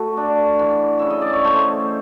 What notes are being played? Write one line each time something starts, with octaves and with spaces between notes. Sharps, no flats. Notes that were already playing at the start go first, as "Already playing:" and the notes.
Already playing: A3 F#4
D4
E3
C#3 E5
D#5
D5
C#5
A3 C5